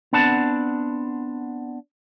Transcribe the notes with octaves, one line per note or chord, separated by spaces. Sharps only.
B3 C4 D4 B4 F#5 A5